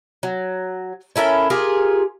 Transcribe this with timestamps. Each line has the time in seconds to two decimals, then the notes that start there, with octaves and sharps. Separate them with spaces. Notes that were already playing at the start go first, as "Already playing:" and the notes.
0.23 F#3
1.16 C#4 E4 A4 A#4
1.50 F4 G4 G#4 A#4